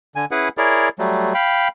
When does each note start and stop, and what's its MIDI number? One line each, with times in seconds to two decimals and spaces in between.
0.15 0.25 50
0.15 0.25 80
0.31 0.49 61
0.31 0.49 64
0.31 0.49 68
0.31 0.49 71
0.31 0.49 78
0.58 0.89 64
0.58 0.89 68
0.58 0.89 70
0.58 0.89 73
0.58 0.89 74
0.99 1.33 54
0.99 1.33 55
0.99 1.33 57
1.34 1.68 77
1.34 1.68 79
1.34 1.68 83